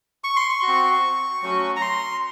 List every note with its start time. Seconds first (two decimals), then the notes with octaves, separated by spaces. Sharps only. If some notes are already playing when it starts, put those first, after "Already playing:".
0.24 C#6
0.36 C6
0.50 C#6
0.62 F#4
0.68 C4
1.42 F#3 A3 C#4 F#4
1.76 A#5
1.81 C6